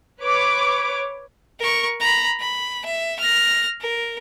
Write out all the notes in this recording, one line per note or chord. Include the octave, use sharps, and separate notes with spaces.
B4 C#5 D6
A#4 C#6
A#5 B5
B5
E5
F6 A#6
A#4